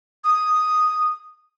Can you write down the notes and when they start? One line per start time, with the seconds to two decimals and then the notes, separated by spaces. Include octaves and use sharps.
0.24 D#6